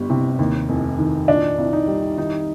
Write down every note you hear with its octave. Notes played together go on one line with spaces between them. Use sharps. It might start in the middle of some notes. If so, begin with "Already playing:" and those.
Already playing: G1 G3
C3
D#2
F1
D#3
A#2 D4
C2
D#4
G3
D#3 D#4